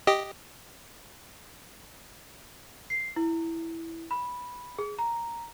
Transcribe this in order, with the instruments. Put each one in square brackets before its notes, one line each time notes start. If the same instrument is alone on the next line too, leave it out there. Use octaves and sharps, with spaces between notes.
[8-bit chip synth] G4 D#5
[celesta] C7
E4
B5
G#4
A#5